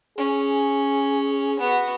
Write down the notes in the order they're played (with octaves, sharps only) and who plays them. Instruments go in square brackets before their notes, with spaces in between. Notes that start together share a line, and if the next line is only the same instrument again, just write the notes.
[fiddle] C#4 [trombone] G#4
[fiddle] B3 F#4